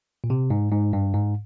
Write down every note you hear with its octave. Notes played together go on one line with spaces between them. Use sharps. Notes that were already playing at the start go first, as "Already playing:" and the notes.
A#2
C3
G#2
G#2
G2
G#2